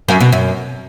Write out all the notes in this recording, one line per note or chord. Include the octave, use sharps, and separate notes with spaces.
F#2
B2
F#2